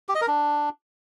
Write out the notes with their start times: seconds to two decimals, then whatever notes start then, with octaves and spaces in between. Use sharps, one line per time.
0.09 G4
0.15 D#5
0.21 A#4
0.28 D4